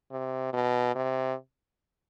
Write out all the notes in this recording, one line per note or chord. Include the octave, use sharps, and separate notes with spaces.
C3
B2
C3